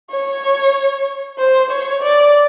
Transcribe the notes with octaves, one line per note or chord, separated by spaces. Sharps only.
C#5
C5
C#5
D5